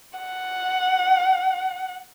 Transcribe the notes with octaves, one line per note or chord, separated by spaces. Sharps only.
F#5